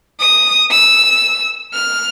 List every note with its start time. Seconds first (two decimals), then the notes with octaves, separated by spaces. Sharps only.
0.20 D#6
0.71 E6
1.73 F6